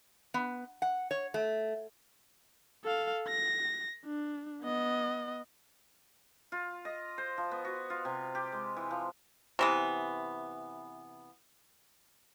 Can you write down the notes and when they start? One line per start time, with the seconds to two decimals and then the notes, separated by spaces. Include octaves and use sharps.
0.34 B3
0.82 F#5
1.11 C#5
1.34 A3
2.84 A4 F5
3.28 A#6
4.06 D4
4.62 B3 D#5
6.52 F4
6.85 D#5
7.18 C5
7.38 F3
7.51 B3
7.65 F#4
7.90 F4
8.05 C3
8.35 G4
8.52 G#3
8.77 E3
8.91 F3
9.59 C3 E3 B3